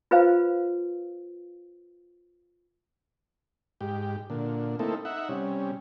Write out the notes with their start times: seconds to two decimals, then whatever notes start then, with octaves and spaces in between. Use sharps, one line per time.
0.11 F4 B4 C5 F5
3.81 G#2 G4
4.30 A#2 D3
4.79 A3 A#3 C4 D#4 E4 A4
5.05 D#4 E5 F#5
5.29 C3 G3 C#4